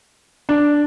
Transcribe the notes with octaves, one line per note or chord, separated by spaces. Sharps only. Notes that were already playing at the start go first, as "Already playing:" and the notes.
D4